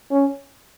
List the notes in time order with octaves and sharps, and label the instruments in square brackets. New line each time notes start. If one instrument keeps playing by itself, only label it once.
[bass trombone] C#4